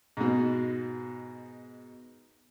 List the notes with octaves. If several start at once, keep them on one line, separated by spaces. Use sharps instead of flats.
G#2 B2